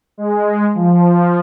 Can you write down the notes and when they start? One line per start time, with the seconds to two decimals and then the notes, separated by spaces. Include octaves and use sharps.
0.18 G#3
0.75 F3